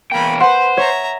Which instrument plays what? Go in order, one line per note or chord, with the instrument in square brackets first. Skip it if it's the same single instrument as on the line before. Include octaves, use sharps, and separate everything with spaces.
[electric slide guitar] E2 G5 [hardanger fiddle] A#3 B5
[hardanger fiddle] B4 [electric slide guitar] C5 [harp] F#5 [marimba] C6
[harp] C#5 [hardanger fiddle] E5 A#5